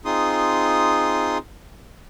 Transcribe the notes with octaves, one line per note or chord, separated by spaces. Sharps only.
C4 D#4 F4 G#4 C6 D#6